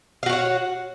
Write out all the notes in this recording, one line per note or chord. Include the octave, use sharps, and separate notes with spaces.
F#4 C#5 F5 F#5